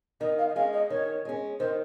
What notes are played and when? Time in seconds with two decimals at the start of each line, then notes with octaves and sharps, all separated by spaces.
0.21 D#3 D#5
0.38 F5
0.48 D#5
0.56 G#3 C#4 F5
0.73 D#5
0.90 D#3 C#5
1.25 G#3 C#4
1.60 D#3 C5